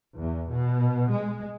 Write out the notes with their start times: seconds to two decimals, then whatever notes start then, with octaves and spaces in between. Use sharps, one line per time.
0.19 E2
0.50 B2
1.11 G#3